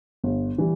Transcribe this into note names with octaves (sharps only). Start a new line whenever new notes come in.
G1
E3 G3